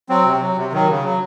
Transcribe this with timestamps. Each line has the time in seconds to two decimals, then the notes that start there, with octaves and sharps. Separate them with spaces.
0.09 F#3 C4
0.25 C3
0.41 F#3
0.57 C3
0.72 D#3 F#3
0.89 C#3
1.04 F#3